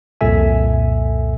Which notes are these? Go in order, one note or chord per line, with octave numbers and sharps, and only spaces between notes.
C2 F2 A#2 A4 E5 G#5